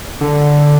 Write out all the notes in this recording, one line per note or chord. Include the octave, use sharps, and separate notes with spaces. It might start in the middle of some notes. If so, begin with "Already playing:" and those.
D3